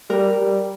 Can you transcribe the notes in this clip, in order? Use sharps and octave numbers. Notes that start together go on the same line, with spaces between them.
G3 A#4
G3